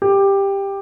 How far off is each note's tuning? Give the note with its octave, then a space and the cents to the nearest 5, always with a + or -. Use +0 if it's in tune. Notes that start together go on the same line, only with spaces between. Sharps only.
G4 +10